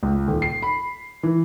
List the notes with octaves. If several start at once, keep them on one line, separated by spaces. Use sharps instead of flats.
C#2
D#1
C7
B5
E3